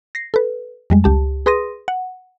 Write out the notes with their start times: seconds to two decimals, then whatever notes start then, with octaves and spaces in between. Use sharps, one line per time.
0.15 A#6 C7
0.34 A4 B4
0.90 F2 G3 G#3
1.04 C#2 G4 A5
1.46 G#4 B4 C6 D#6 A#6 D#7
1.88 F#5